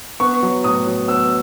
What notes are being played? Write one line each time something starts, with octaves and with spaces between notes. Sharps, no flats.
B3 C#6
F#3
A2 D#6
F#3
B3 E6